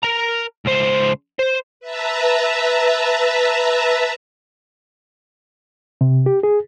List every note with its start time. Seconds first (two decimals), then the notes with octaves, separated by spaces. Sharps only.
0.03 A#4 A#5
0.66 C#2 C5
1.39 C5
1.80 B4 E5 A5 A#5
6.01 C3
6.26 G4
6.43 G#4